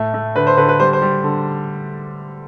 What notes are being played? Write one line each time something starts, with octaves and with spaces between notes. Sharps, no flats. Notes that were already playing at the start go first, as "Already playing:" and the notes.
Already playing: A2 A3
A3
D3 B4
C5
D3 B4
B4
G3 C5
C5
G3
D3